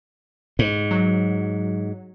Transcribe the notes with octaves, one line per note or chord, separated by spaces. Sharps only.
G#2
F#3